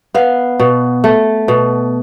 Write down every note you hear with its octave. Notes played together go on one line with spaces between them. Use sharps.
B3 F5
B2
A3
B2